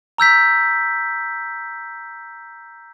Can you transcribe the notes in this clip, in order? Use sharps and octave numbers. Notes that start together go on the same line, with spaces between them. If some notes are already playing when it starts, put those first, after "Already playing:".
A#5 E6 G6 B6